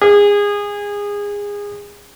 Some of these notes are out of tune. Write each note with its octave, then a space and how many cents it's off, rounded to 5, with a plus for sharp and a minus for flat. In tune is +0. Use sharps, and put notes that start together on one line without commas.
G#4 -25